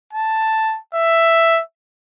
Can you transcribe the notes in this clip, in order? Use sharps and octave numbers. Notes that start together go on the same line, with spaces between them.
A5
E5